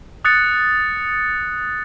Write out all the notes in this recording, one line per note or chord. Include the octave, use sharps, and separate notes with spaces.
D#6 F#6 A6 C#7